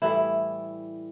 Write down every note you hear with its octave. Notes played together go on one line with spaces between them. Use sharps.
A2 E3 G3 E4